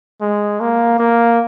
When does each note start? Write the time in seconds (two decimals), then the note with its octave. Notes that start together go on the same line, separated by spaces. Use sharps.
0.21 G#3
0.60 A#3
0.99 A#3